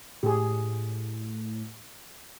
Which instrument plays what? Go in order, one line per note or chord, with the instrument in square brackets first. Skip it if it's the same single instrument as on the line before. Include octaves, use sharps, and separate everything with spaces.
[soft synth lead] A2 [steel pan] G4 G#4